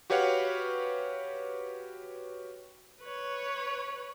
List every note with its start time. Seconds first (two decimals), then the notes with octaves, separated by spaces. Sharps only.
0.10 F#4 G4 B4 C#5 F5 F#5
3.03 B4 C#5